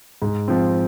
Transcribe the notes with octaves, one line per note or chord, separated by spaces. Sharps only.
G#2
F3 C4